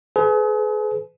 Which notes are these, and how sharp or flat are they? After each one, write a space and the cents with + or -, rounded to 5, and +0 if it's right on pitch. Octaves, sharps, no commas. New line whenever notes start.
G#4 +40 B4 +30